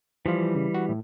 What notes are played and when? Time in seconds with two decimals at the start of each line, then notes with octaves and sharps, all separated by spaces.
0.26 E3 F3 G3 F4
0.55 C#3
0.74 F#4
0.89 A2